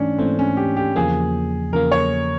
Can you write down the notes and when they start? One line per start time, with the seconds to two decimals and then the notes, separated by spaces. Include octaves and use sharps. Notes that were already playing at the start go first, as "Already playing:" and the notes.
Already playing: G#2 E3 A3 C#4 D4
0.18 G#2 E3 A3 C4
0.39 C#4
0.57 G4
0.77 G4
0.96 E2 C#3 F3 A#3 G#4
1.73 E2 C#3 F3 A#3 A#4
1.92 C#5